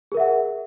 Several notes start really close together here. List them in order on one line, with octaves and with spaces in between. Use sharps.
G#4 A#4 E5 F#5